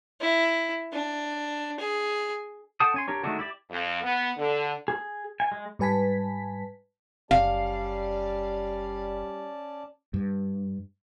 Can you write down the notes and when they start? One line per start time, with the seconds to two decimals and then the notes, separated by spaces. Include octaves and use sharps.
0.20 E4
0.93 D4
1.80 G#4
2.80 A4 F#5 G5 A5 D#6
2.94 C#4 G#5 C6
3.08 D4 G4 A#4 C#5
3.24 D#3 G#3 A3 D4 F#4
3.39 E4 G4 D5 E5
3.71 F2
4.03 B3
4.38 D3
4.88 G#4
5.40 G#5
5.52 G#3
5.79 G#2 G3 B4 G#5 A5 B6
7.31 F#1 G3 C#4 D5 F5 A5
10.14 G2